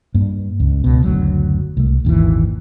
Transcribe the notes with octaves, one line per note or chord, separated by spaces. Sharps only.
G2 A#3
C#2
C#2 B2
F#1 D2 F#3
C2 A3
G#1 D#2 A#2 E3